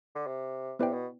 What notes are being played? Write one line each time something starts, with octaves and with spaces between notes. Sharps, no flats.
D3
C3
C3 B3 E4 B4 D5 G5
B2